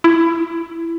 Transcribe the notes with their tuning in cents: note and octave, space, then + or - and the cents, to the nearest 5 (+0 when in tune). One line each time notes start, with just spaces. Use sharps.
E4 +20